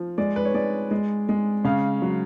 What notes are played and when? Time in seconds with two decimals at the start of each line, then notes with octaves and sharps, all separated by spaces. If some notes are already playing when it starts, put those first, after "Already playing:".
Already playing: F3
0.18 G#3 D5
0.36 B4
0.45 C#5
0.54 G#3 D5
0.91 G#3
1.29 G#3
1.64 C#3 F5
2.02 F#3